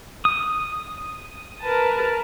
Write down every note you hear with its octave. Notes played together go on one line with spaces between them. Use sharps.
D#6
A#4 B4 A5